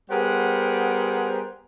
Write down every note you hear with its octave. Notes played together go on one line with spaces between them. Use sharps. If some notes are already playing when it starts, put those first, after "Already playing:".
G3 B3 G#4 A#4 C5 F#5